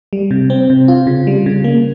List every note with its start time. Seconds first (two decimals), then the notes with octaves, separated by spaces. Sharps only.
0.13 G3
0.31 C3
0.50 C4
0.70 C3
0.88 F4
1.07 C#3
1.27 G3
1.46 C#3
1.64 A#3